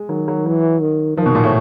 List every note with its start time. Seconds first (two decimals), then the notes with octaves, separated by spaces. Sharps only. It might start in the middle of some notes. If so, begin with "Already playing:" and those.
Already playing: G#3
0.09 D#3 F#3
0.28 F#3
0.46 E3 F#3
0.81 D#3
1.17 D#3 F3
1.26 B2
1.35 A#2
1.44 A2